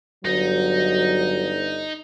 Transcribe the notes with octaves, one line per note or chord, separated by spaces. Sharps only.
G1 F#3 D#4